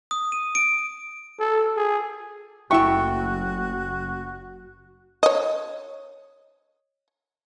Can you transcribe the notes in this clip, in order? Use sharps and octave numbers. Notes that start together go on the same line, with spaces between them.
D#6
D#7
D7
A4
G#4
F#1 A3 E4 F#4 E5 G5 C#6
C#5 D#5